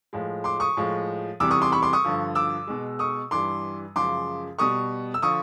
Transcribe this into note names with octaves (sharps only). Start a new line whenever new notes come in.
A2 F3 G#3
C6 D6
C#6 D#6
A2 F3 G#3
E2 C3 E3 G3 D6 E6
C#6 D#6
C6 D6
B5 C#6
C6 D6
C#6 D#6
G2 D3 F3
D6 E6
B2 G#3
C#6 D#6
G2 E3 G3 C6 D6
F#2 C#3 F3 G#3 C6 D6
B2 G3 C#6 D#6
E6
D3 F3 C#6 D#6